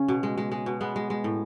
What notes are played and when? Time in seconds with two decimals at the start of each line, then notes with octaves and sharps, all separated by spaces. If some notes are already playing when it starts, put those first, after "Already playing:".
Already playing: C#3 C#4
0.08 B2
0.23 G#3
0.38 G#3
0.52 G#3
0.66 B2
0.81 G#3 B3
0.96 G#3
1.10 G#3
1.24 A2